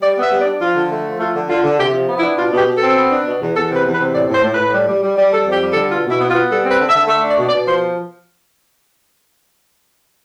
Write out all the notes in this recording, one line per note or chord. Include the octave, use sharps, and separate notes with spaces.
G3 D5
B3 E5
G3
D5
D4
F3 F4
D3
A3
F3
A3 F4
D3
D3 F4
D3
C3 G4
F3
B3
E4
D4
B2 F4
B2 G4
B2
C4 A4
B3
D4
B2
E2
E2 A4
C3 B4
E2
B4
C3
A2 D5
A2
C5
A2
A2 B4
G3
G3
G3
G3
G3 A4
F2 G4
G3
A4
D3
B2 F4
B2 E4
B3
F4
B3
G3 A4
C4
B4
D3
E5
D3
A3 E5
D4
D5
B2
D5
B2
F3 C5